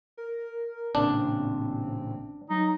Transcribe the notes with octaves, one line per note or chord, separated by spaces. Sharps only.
A#4
A1 A#2 C#3 C4 D4
F#3 D#4